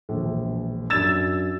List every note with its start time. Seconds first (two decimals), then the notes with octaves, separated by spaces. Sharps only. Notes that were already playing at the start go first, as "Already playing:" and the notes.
0.09 E1 A#1
0.90 F#2 D4 E6 G#6 A6 E7